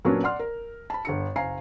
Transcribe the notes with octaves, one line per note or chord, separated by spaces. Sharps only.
A#2 F#3 A#3 B3 C#4 D4
D5 F#5 C6 F6
A#4
A5 B5
G1 D3 C#7
F#1 F5 G#5 A#5 C7